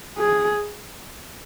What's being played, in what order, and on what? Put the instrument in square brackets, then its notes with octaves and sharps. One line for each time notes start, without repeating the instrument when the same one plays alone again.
[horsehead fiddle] G#4